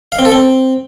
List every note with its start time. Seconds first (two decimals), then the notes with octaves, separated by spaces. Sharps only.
0.12 F5
0.19 C4
0.25 A4
0.32 C4